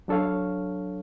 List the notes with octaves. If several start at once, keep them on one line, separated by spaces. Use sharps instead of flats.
F#3 D4 A4 C#5 F5